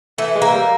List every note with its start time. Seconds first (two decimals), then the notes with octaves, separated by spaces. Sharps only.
0.18 E3 A3
0.36 G#3
0.42 A#3
0.54 G3